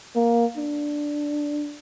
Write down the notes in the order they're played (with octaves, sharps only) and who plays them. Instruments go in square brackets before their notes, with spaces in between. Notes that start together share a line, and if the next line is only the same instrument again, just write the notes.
[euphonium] A#3
D4